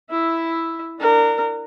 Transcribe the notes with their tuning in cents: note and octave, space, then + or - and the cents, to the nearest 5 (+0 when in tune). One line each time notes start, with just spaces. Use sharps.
E4 +0 E5 +0
D4 +10 A#4 -25